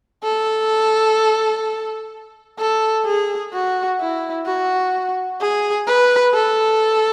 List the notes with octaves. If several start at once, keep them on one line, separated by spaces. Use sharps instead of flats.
A4
A4
G#4
F#4
E4
F#4
G#4
B4
A4